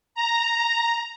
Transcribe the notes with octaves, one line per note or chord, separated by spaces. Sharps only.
A#5